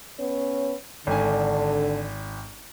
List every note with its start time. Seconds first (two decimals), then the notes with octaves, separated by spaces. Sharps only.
0.20 B3 C#4 C#5
1.07 G#1 D3 G#5